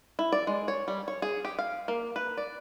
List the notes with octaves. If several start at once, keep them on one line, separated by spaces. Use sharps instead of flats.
E4
D5
G#3
C#5
G3
C#5
G#4
G4
F5
A#3
B4
D5